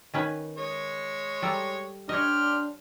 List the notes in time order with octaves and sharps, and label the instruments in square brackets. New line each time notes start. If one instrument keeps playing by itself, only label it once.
[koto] D#3 C#4 B4
[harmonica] G#3 C#5
[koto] G3 A4 A#5
[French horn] D4 [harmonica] G4 C6 F6 [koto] C#5 D#5